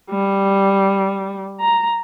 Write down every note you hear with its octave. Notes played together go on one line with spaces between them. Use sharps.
G3
A#5